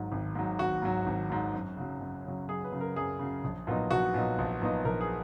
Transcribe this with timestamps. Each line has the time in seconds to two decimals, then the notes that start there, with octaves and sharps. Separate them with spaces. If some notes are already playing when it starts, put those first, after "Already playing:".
Already playing: G#1 G#2 F#3
0.12 G#1
0.35 G#2 F#3
0.59 G#1 F#4
0.82 G#2 F#3
1.06 G#1
1.30 G#2 F#3
1.54 F#2
1.77 C#3 F#3
2.01 F#2
2.25 C#3 F#3
2.48 F#2 G#4
2.64 B4
2.72 C#3 F#3
2.81 A#4
2.96 F#2 G#4
3.19 C#3 F#3
3.44 A#1
3.67 A#2 F#3 B3 D#4
3.91 A#1 F#4
4.14 A#2 F#3 B3 D#4
4.38 A#1
4.62 A#2 F#3 B3 D#4
4.85 A#1 A#4
5.01 G#4